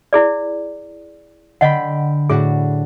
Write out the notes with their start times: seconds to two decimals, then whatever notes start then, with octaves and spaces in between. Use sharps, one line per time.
0.13 E4 G#4 D5
1.61 D3 D#5 F#5 G5 B5
2.30 A2 D4 F#4 G#4